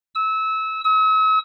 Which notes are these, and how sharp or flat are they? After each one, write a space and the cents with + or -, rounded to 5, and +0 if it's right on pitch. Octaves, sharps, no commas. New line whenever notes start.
E6 -25
E6 -45